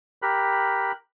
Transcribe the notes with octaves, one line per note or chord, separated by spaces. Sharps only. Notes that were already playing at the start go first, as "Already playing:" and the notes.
G4 A#4 B5 F#6